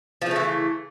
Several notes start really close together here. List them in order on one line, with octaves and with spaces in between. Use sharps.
F3 C#3 A3 E3